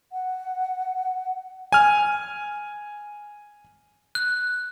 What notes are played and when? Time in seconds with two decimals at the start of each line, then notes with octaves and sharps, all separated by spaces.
0.12 F#5
1.72 G#5 F6
4.15 F#6